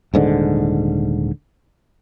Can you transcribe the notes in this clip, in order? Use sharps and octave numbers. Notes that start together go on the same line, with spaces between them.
D#1 G#2 D3